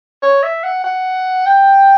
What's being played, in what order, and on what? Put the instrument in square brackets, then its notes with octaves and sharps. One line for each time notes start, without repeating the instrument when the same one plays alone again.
[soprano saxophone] C#5
E5
F#5
F#5
G5